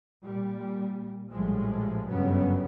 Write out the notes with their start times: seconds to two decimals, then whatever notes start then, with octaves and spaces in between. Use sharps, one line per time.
0.22 A#2 G3
1.29 A#1 A2 F3 G3 G#3
2.08 G1 F#2 C#3 F#3 G3 B3